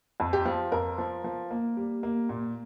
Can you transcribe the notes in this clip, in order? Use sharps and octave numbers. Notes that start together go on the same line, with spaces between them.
F2
G4
F3
F2 A#4
F3
F3
A#3
G3
A#3
A#2